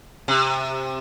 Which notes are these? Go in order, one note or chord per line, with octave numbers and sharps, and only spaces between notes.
C3